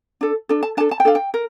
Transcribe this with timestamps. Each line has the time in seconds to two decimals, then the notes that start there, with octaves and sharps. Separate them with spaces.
0.21 D4 A4
0.49 D4 A4
0.63 A5
0.77 D4 A5
0.80 A4
0.91 A5
1.00 G5
1.05 D4 A4 F5
1.15 G5
1.34 A#4